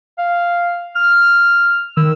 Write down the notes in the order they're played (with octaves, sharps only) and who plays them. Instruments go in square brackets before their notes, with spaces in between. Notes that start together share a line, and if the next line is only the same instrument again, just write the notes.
[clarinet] F5
F6
[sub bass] D#3 [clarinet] E6